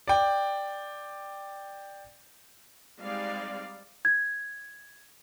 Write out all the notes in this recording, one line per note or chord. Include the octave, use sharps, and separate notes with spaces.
D5 G5
G3 G#3 C4 D#4 D5 F5
G#6